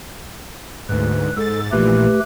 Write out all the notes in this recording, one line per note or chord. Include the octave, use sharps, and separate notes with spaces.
D2 G#2 B4
G#2 A4 A6
A#1 A#2 E3 A3 G4 B4